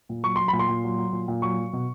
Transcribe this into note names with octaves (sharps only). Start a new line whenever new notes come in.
A#2
F#3 C#6
F#3 C6
A#2 B5
C6
A#2
F#3
F#3
A#2
A#2
F#3 C#6
F#3
B2